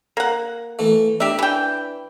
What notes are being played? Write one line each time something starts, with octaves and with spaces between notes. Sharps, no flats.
A#3 F#5
E3 A3
D4 G4 E5
E3 G5